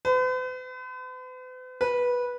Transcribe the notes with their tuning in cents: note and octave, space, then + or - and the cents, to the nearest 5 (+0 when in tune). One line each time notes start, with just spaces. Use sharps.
B4 +45
B4 -15